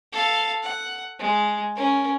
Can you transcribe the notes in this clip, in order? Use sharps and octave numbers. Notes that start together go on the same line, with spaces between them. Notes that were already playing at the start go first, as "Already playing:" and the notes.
A4 F5
F#5
G#3
C#4 A#4